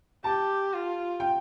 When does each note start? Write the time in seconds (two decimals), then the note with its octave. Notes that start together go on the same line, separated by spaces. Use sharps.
0.24 G4 A5
0.73 F4
1.20 G5